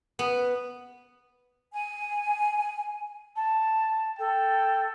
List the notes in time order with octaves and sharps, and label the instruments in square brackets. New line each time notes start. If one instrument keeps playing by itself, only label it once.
[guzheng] B3
[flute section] G#5
[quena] A5
[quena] A4 [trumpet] G5